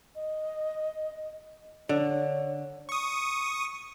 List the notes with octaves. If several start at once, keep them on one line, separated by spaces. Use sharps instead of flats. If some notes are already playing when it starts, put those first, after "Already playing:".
D#5
D3 C#5
C#6 D#6